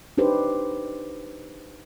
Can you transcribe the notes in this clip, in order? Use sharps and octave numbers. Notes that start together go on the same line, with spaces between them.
D4 D#4 G4 B4 C5